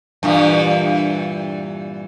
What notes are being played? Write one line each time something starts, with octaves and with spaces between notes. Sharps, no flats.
G2 A#2 E3